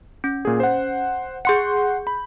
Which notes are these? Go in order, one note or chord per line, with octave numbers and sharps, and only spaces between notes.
C#4
A#2 G#4
C5 F#5
G#4 F#5 C6 G6 C#7
B5